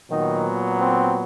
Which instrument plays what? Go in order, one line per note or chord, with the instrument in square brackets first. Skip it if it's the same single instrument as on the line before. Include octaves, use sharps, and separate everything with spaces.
[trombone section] A#2 D#3 F#3 B3 D#4
C4